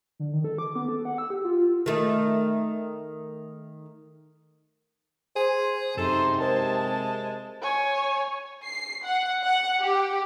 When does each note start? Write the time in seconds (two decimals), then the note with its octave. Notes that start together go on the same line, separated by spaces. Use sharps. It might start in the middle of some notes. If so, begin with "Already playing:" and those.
0.19 D3
0.33 D#3
0.44 A4
0.58 D6
0.76 B3
0.89 A4
1.05 F#5
1.18 E6
1.30 G4
1.45 F4
1.86 D#3 A3
5.36 G#4 C5
5.97 F#2 C3 D#4 A4 C5
6.41 G#3 A#4 C5 A5
7.62 C#5 G#5
8.65 C7
9.05 F#5
9.45 F#5
9.81 G4